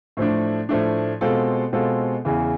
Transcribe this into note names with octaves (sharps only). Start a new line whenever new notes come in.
A2 F3 A3 D4
A2 F3 A3 D4
B2 G#3 C4 F4 A4
B2 G#3 C4 F4 A4
E2 C#3 E3